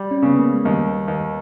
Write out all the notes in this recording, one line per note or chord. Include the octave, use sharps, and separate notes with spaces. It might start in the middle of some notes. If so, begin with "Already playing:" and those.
Already playing: G3
C#4
C#3 B3
A#3
G#3
D#2 G3
D#2